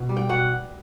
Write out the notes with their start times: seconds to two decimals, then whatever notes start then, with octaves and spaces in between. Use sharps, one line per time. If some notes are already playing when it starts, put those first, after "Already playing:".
Already playing: B2
0.09 G3
0.17 G5
0.29 B2 F#5